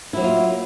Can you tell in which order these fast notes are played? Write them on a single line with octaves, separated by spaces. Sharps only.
E4 F#3 A#3 F4